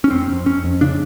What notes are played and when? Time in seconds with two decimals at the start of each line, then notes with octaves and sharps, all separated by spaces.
0.04 C#4
0.11 F2 C4
0.29 F2
0.46 F2 C#4
0.64 F2
0.81 C#3 D4